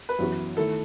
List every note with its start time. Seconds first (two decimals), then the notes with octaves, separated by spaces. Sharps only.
0.09 B4
0.19 F#2 E3 B3 F#4
0.57 D#3 A3 E4 A4